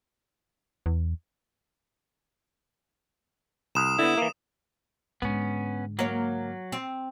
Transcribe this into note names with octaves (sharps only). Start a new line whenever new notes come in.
E2
C2 D#6 E7
D3 B3 E4
E3 A#3
G#2 D3 B3 C#4
F#3 A#3 C#5
C4